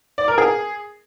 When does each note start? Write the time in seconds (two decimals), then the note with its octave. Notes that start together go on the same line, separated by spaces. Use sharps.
0.18 D5
0.28 A#4
0.38 G#4